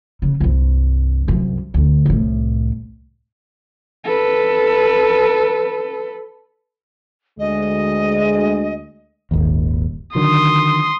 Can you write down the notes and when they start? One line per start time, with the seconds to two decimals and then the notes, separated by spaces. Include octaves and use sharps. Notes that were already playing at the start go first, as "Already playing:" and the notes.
0.22 C#3
0.40 C2 G2
1.28 C2 F#2
1.74 D2
2.06 C2 A2
4.04 A4 B4
7.39 D2 G#3 D#5
9.31 D#1 G#1 D#2
10.15 D3 D#3 F#3 C6 D#6